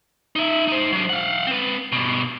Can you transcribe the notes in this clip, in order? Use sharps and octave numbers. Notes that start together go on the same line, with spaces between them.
D#4 E5
D#4 C5
F#3 D4
F5 F#5
C4 B4
G2 B2